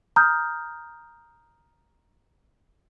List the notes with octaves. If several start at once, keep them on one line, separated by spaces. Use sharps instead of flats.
A#5 D#6 F6 G6